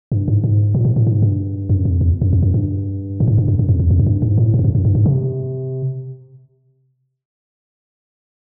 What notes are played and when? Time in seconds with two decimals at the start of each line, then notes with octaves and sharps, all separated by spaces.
0.12 G2
0.28 G#2
0.44 G#2
0.74 A#2
0.85 A2
0.96 A2
1.07 G#2
1.22 G2
1.69 F#2
1.85 F2
2.01 E2
2.22 F#2
2.33 F2
2.43 F#2
2.54 G2
3.20 A2
3.28 G#2
3.38 G2
3.48 F#2
3.59 F#2
3.69 F2
3.80 E2
3.91 F2
3.99 F#2
4.07 G2
4.22 G#2
4.38 A2
4.54 G#2
4.59 F2
4.65 F#2
4.75 F#2
4.85 G2
4.95 G#2
5.06 C3